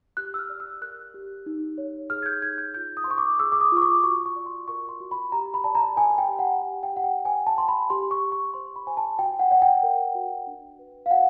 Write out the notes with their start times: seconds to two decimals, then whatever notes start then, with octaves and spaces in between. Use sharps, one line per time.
0.17 G4 F#6
0.34 E6
0.39 F6
0.49 D5
0.60 E6
0.81 A#4 F#6
1.14 G4
1.46 D#4
1.78 C#5
2.10 G#4 F6
2.22 G#6
2.26 G6
2.42 D#4 G#6
2.58 G6
2.74 F4 G6
2.97 D#6
3.04 C6
3.07 C5 C#6
3.18 D6
3.40 G#4 E6
3.52 D6
3.61 D#6
3.72 F4
3.77 C#6
3.82 D6
4.03 F#4 C#6
4.26 C#6
4.36 D5
4.46 C6
4.68 A#4 C#6
4.89 C6
5.01 F#4
5.11 B5
5.32 G4 A#5
5.54 B5
5.64 D5 A5
5.75 A#5
5.96 A#4 G#5
6.18 G5
6.29 G4
6.39 F#5
6.61 G4 F#5
6.83 G5
6.93 G4 F#5
7.04 G5
7.25 C5 G#5
7.47 A5
7.57 C5 C6
7.68 B5
7.90 G4 C6
8.11 C#6
8.22 G4
8.32 C#6
8.54 C5 C6
8.76 B5
8.87 C5 G#5
8.97 A5
9.18 F#4 G5
9.39 F#5
9.51 D5 F#5
9.62 G5
9.83 A#4
10.15 F#4
10.47 D4
10.79 B4
11.06 F5
11.11 F#4 F#5